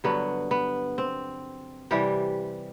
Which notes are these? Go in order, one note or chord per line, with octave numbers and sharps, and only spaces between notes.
G2 D3 F#3 B3
B3
C4
C3 E3 G3 G4